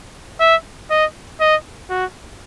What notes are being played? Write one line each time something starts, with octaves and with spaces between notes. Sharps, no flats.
E5
D#5
D#5
F#4